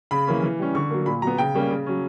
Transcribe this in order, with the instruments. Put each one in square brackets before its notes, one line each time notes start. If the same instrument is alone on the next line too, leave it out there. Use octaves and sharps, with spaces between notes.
[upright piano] C#3 B5
E3 A#3 C#4
E3
G3 C#4
D3 C#6
F#3 A#3
A#2 B5
F#3 A#5
B3
C#3 G5
G3 A#3 C#4
C#3
F#3 C#4